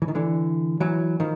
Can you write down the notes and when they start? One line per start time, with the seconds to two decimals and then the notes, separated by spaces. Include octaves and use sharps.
0.02 E3
0.08 D#3
0.15 D3 E3
0.80 E3 F#3
1.20 D#3 F3